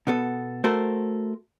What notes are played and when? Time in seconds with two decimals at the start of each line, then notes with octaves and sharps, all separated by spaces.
0.07 B2 B3 A4
0.64 A3 F#4 A4 A#4 C5